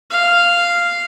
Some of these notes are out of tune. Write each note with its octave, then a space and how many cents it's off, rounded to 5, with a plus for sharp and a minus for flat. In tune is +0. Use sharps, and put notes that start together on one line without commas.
F5 -5